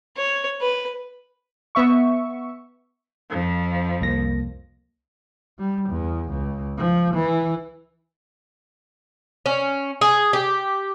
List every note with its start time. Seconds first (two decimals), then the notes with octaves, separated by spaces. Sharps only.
0.17 C#5
0.61 B4
1.75 B3 E5 C#6
3.29 F2 F3
4.01 C2 A#3 A#6
5.59 G3
5.89 E2
6.29 C#2
6.77 F3
7.14 E3
9.46 C#4
10.01 G#4
10.33 G4